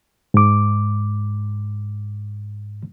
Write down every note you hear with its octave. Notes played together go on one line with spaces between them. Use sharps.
G#2 D6